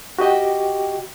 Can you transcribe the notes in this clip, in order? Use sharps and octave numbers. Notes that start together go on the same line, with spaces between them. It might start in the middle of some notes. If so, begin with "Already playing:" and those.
F#4 G4 D#5 G5